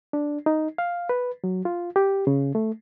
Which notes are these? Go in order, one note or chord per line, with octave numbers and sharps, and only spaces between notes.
D4
D#4
F5
B4
F#3
F4
G4
C#3
A3